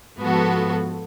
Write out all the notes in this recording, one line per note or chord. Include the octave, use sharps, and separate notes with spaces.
G#2 F3 B3 F#4 A4